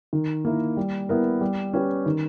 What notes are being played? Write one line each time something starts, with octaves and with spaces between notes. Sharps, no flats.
D#3
A#3 E4 A#4
G3
B3 E4 A#4
G3
C#4 G4 B4
D#3